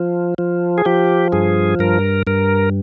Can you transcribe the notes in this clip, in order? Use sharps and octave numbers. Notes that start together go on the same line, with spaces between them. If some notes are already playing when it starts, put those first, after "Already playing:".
Already playing: F3
F3
G#4
F3 G4
G2 G#4
G2 A#4
G2 A#4